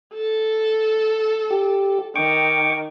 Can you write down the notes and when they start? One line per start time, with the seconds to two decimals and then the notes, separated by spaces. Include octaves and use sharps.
0.14 A4
1.51 G4
2.16 D#3 G5 C#6 D6